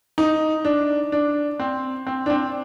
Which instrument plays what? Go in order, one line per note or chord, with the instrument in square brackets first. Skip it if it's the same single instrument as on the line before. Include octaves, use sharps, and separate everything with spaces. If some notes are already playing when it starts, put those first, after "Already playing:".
[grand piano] D#4
D4
D4
C4
C4
D4
C4